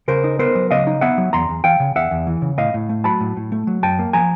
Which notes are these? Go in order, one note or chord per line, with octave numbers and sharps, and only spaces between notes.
C#3 A#4 C5
D#4
B3 A#4 C5
F#3
C#3 D#5 F5
D#4
B3 E5 F#5
F#3
E2 A#5 C6
E2
E3 F5 G5
C#3
E2 E5 F#5
E2
E3
C#3
A2 D#5 F5
A2
A3
F#3 A5 B5
A2
A2
A3
F#3
F#2 G5 A5
A#3
F3 G#5 A#5